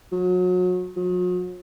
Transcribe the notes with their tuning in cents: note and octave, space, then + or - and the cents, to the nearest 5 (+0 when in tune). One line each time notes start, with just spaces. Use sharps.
F#3 -30
F#3 -45